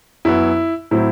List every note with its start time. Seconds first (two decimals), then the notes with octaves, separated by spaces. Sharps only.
0.25 F#2 F#3 B3 E4
0.91 A2 F#3 C4 E4